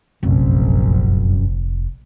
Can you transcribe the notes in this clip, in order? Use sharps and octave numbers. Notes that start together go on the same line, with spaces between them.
F1 A#1 F#2